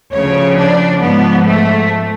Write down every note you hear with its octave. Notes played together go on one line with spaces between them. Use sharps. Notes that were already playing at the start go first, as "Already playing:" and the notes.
D2 C#3 F3 C#5
D4
G#2 F3 B3
A3